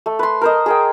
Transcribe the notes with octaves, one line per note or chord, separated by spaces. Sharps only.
A3
B4 C6
A#4 C5 D#5
G#4 A#4 G5